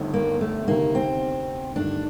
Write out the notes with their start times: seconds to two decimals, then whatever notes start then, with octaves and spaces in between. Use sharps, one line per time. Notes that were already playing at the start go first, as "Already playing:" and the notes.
Already playing: G1 G2 D#3 A3 C4
0.14 A#3
0.41 A3
0.67 D2 C3 D#3 A#3
0.95 C4
1.76 G1 G2 D#3 A3 D4